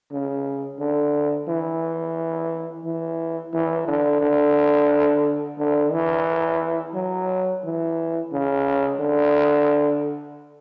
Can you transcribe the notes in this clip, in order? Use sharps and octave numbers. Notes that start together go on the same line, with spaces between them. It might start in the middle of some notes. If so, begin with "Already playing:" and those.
C#3
D3
E3
E3
E3
D3
D3
D3
E3
F#3
E3
C#3
D3